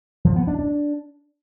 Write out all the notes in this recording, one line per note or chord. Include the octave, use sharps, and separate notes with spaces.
F3
B3
D4
D4